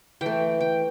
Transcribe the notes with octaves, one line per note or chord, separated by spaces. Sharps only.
E3 A3 G5
G5